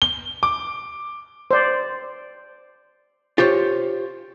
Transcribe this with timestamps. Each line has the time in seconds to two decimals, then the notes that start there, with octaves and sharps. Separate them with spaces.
0.02 G7
0.43 D6
1.51 C5 D5
3.38 F4 G4 C5 C#5